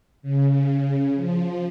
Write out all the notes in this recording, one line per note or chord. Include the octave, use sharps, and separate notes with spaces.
C#3
F3